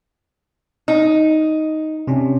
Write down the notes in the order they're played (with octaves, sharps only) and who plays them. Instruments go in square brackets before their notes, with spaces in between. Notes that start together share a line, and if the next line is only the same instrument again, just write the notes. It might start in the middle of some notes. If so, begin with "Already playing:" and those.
[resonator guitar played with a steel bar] D#4
[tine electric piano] C3 C#4 D4